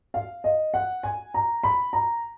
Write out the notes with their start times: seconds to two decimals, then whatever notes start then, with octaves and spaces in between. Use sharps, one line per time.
0.14 F5
0.44 D#5
0.74 F#5
1.03 G#5
1.34 A#5
1.64 B5
1.93 A#5